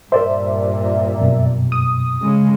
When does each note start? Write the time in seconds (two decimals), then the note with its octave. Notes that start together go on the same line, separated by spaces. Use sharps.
0.12 G2 A#2 A#4 C5 D5 E5
1.20 F#2 B2
1.72 D#6
2.22 C#3 G#3